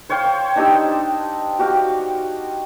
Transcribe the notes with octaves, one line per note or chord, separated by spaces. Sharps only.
C5 C#5 F5 G5
D4 D#4 G4 E6
F#4 G4 F5